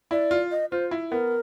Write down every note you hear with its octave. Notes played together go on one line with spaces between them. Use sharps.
E4 D5
F4
D#5
F4 C5
E4
B3 A#4